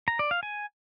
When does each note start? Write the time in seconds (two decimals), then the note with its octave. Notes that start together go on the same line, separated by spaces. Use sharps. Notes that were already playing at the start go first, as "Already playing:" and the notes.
0.08 A#5
0.19 D5
0.31 F5
0.43 G#5